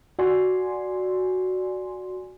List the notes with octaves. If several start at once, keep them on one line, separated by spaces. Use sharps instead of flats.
F#4 D5 G#5 C6